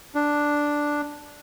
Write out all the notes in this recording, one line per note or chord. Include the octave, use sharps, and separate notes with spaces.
D4